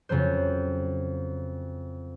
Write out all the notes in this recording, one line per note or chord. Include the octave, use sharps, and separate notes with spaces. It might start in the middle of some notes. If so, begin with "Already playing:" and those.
F2 C#3 F#3 C5